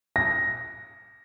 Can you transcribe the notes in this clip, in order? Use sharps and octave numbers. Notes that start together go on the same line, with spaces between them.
A#6